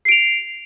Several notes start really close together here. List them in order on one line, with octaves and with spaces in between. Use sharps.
C7 D7 F7